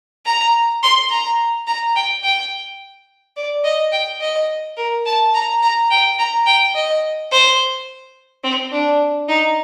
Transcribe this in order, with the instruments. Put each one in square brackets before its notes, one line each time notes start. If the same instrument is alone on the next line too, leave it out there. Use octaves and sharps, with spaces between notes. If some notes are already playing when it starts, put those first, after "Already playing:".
[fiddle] A#5
C6
A#5
A#5
G5
G5
D5
D#5
G5
D#5
A#4
A5
A#5
A#5
G5
A#5
G5
D#5
C5
C4
D4
D#4